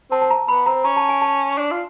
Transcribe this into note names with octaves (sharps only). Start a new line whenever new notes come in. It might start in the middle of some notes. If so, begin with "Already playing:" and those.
C4 A5
A5
A#5
B3 B5
C4 A#5
C#4 A#5
A5
G#5
A5
D4
F4